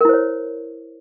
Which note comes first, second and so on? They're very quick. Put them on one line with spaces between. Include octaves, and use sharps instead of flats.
A#4 E4 C5 C#5